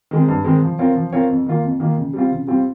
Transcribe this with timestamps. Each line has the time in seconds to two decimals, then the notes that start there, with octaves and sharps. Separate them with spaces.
0.11 D#3 G#3 C4
0.28 G2
0.44 D#3 G#3 C4
0.62 F3
0.79 C4 F4 A#4 C#5
0.95 F3
1.13 C4 F4 A#4 C#5
1.29 F2
1.46 D#3 A#3 F4
1.64 F2
1.80 D#3 A#3 F4
1.97 C#3
2.14 G3 C4 F4
2.32 C#3
2.47 G3 C4 F4